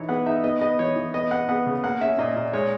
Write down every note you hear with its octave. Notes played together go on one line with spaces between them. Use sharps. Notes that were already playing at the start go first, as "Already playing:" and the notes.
Already playing: E3 D#4 C#5
B3 F#5
D#4 E5
B3 D#5
B3 D#5
E3 C#5
E3
B3 D#5
B3 F#5
B3 F#5
C#3
A#3 F#5
C#4 E5
A#2 D#5
A#2
G#3 C#5